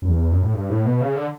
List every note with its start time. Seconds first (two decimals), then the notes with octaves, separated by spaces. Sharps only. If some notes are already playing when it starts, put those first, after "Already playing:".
0.02 F#2
0.08 E2
0.32 F#2
0.43 A2
0.54 G2
0.70 A2
0.85 B2
1.01 C#3
1.16 D3